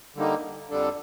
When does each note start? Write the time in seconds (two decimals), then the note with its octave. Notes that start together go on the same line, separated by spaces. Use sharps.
0.15 D3 G3 A#3 D#4
0.70 F2 D3 G3 D4 A4